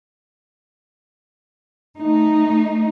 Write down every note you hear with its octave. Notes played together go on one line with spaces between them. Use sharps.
A3 D#4